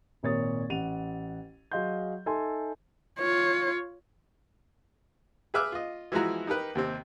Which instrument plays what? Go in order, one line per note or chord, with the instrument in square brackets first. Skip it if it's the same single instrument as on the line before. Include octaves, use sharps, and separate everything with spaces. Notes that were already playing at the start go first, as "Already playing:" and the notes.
[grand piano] G#1 A#2 A#4 C#5 D#6 A6
A1 F#5 D#7 F7
F#3 G#4 D#5 F5 C6 G6
D#4 A4 E5 G#5 A5 C6
[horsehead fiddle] F4 C#5
[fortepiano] G#4 B4 E5 D6 F6
F4 D#5
E3 F3 G#3 E4 F#4 A#5
D#4 G4 A#4 B4
D#2 C3 C4